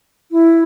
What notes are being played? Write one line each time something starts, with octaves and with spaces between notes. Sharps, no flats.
E4